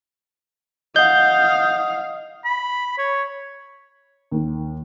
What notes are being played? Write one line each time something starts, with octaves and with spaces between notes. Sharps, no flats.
D#5 F5 F#5 D#6 G6
B5
C#5
D#2